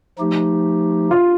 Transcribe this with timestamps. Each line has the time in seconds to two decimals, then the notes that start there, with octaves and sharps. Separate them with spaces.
0.19 F3 A3 D#4 G4
1.11 F4